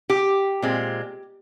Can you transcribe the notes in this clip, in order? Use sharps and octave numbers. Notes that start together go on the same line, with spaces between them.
G4
A#2 G#3 C4